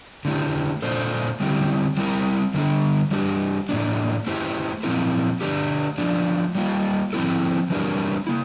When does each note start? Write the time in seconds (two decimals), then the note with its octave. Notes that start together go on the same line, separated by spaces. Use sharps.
0.25 D3 A3 E4 G4
0.82 A#2 A3 D4 A4 C5
1.40 D3 G3 C4 E4 G4
1.97 G3 C4 E4 A#4
2.54 D3 G3 D4 A4
3.11 E3 G3 D4 G4
3.69 A2 E3 A#3 D4
4.27 A3 E4 G4 C5
4.83 A#2 F3 C4 E4 A#4
5.41 D3 A3 D4 G4
5.98 F3 A3 D4
6.55 G3 A#3 F4
7.13 F3 C4 E4 A4
7.70 E3 G3 D4 G4 A#4
8.27 A#3 E4